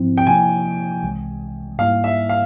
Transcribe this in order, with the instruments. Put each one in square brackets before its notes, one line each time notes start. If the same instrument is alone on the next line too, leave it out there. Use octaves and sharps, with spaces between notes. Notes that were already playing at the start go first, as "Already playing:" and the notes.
Already playing: [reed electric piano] G#2 F3 C4 E4
[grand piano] G5
[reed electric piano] C3 F3 A#3 E4 [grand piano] G#5
[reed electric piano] C2 C3 E3 G#3
[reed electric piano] G#2 G3 A#3 E4 [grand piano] F5
[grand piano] E5
F5